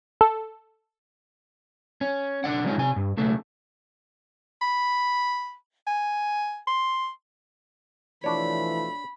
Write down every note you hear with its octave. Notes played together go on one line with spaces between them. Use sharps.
A4
C#4
B1 D4 D5 F#5
F3 G#3 C#4 D#4
C3 G#5
G2
B1 C#3 A3
B5
G#5
C6
B2 E3 F3 A3 D4 C#5 B5